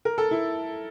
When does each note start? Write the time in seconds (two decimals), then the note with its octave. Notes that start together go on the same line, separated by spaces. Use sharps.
0.05 A#4
0.18 A4
0.31 E4